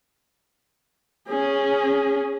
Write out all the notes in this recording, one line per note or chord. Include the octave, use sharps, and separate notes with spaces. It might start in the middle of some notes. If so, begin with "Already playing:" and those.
C#4 G#4